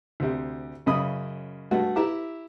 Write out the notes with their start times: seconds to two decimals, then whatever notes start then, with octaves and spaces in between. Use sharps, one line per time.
0.20 D2 C3
0.86 F#2 C#3 D#5 B5 D#6
1.71 G2 A3 F#4
1.96 E4 G4 E5 A#5 D6